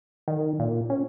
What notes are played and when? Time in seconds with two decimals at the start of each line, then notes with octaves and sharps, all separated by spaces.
0.28 D#3
0.59 A#2
0.90 C#4